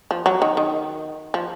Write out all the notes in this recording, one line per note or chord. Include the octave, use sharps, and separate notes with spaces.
F3
F#3
D#3
D#3
F3